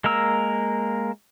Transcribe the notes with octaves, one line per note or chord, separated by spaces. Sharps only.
G#3 A#3 A#4 E6